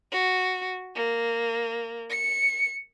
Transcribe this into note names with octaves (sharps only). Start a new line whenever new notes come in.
F#4
A#3
C#7